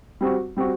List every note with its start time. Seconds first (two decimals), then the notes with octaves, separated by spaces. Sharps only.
0.21 G3 C4 F#4
0.57 G3 C4 F#4